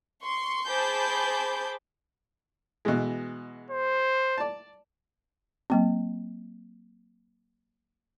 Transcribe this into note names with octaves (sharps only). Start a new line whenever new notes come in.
C6 C#6
G#4 C5 A5 B5 D6 G6
B2 E3 G#3
C5
D5 A5
F#3 A#3 C4